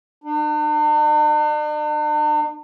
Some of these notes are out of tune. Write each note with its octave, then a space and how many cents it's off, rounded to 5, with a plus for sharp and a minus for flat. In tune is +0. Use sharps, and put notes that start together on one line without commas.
D4 +45